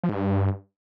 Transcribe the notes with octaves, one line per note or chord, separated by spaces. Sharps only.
F3
G#2
G2